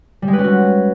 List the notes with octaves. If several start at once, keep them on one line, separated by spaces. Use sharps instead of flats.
G3
G#3
B4
C#4
F#4